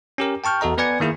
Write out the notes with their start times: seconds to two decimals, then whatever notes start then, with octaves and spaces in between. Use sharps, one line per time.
0.18 C#4 G4 A#4
0.44 G5 A5 C#6 F6 G6
0.61 E2 F#4 A4 D#5 A#5
0.78 B3 B4 D5 G#5 G#6 C#7
1.00 D#3 A#3 E4 G#4